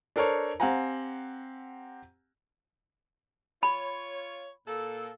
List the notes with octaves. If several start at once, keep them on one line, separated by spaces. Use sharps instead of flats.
D4 A4 A#4 C5 C#5
C4 G4 F5 F#5 G#5 A#5
F4 C#5 B5
A#2 A#3 A4